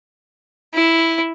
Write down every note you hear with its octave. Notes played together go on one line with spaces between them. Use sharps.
E4